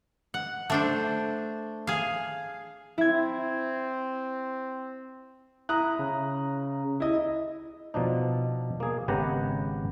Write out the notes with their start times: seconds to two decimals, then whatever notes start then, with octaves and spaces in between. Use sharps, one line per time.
0.34 F#5
0.70 A3 D4 C5
1.87 G#4 F5
2.98 C4 E4 G#6
5.69 E4 A#5 D#6 F#6
5.99 C#3
7.00 E4 D#5
7.94 B2 F3 D4 D#4
8.80 A#3 G#4
9.08 G#1 C#3 B3 G4 F#5 A#5